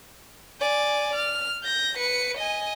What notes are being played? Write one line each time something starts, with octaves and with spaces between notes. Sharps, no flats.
D5 G#5
F6
G6 A#6
B4 C#7
D#5 G#5